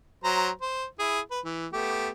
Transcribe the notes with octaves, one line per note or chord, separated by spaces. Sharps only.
F#3 C5 A#5
C5
E4 G#4
B4
E3
A3 B3 G4